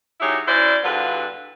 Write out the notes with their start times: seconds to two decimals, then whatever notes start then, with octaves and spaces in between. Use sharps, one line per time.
0.20 F#3 D#4 E4 G4 G#4 C#5
0.47 C#4 E4 F#4 C5 D5
0.84 E2 G2 D3 F4 F#4 B4